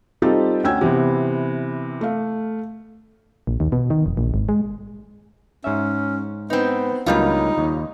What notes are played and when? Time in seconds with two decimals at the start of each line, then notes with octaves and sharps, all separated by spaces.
0.22 G3 C4 D#4 F4 G4 A4
0.64 D2 C#4 G5 E6 G#6
0.81 C3 E3 B3
2.01 A3 F5
3.47 A#1
3.60 D#2
3.72 B2
3.90 D#3
4.06 F1
4.17 A#1
4.34 G#1
4.49 G#3
5.64 G#2 C#4 E5
6.50 B3 C4 D#4
7.06 C#2 G2 F#3 G3 A#3 D#4 F4
7.58 D#2